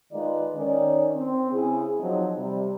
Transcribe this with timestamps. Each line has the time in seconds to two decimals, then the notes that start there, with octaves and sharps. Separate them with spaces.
0.12 D#3 G#3 D#4 F4 B4 D5
0.55 D#3 C#4 D5
1.16 C4
1.51 C#3 C4 E4 G#4
2.00 F3 F#3 C4 D#4
2.38 C3 G3